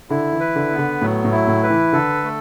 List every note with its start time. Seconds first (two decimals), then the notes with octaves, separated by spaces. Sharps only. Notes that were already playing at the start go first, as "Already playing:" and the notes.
0.10 D3 E4
0.33 E3
0.40 B4
0.56 D3
0.71 B3
0.78 D3
1.01 A2 F#3
1.25 A2
1.32 E4
1.48 A2
1.63 B4
1.70 E3
1.93 D3 A4
2.23 A3